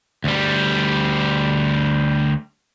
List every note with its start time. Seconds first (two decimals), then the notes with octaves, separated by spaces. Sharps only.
0.24 D2 G3